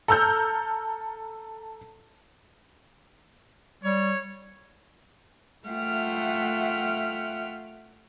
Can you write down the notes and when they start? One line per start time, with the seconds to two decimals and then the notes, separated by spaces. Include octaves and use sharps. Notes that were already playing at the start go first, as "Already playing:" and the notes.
0.08 A4 A#5 E6 F6 G6
3.84 G3 C#5
5.67 A3 F4 E5 F#5 G5 F6